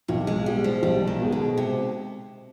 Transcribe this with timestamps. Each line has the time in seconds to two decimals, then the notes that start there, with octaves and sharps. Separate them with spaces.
0.08 B1 C3
0.27 G#3
0.46 B2 G3 G#3
0.64 F3
0.82 B1 G3
1.07 D#3
1.20 B2 G#3
1.32 D3
1.57 C3